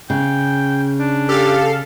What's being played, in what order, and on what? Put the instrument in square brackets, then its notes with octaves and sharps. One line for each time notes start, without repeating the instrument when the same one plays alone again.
[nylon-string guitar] C#3 [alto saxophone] G5
[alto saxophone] D4
[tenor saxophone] G4 [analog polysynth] A4 F5